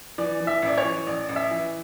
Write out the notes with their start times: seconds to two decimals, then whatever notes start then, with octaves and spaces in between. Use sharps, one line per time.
0.18 E3 D5
0.40 E3
0.47 E5
0.62 A1
0.67 D5
0.78 C#5
0.85 E3
1.07 A1 D5
1.29 A1
1.36 E5
1.51 E3